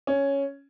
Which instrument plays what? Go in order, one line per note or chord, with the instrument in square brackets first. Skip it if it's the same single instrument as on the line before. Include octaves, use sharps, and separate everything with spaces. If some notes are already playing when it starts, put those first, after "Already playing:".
[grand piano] C#4